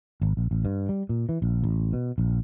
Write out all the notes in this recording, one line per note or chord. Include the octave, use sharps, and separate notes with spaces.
G#1
A#1
A1
G2
G3
A#2
E3
A#1
A1
B2
A#1